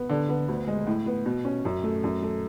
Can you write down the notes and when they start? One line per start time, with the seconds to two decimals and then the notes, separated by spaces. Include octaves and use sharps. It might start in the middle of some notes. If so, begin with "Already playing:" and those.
Already playing: B3
0.09 D3
0.29 B3
0.48 D2
0.67 G#3
0.87 A2
1.06 B3
1.26 B2
1.45 C#4
1.65 F#2
1.84 A3
2.04 F#2
2.22 A3